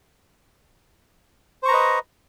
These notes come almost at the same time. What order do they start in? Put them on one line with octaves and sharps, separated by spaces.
C5 C#6 A#5 B4 D#5